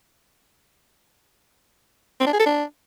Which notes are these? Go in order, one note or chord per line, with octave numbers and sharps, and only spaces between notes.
C4
D4
G#4
A4
D4